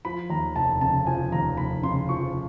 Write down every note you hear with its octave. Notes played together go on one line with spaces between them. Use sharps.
F3 B5
D#2 A#5
F1 A5
C#3 A5
F3 G#5
D#2 A#5
F1 B5
C#3 C6
F3 C#6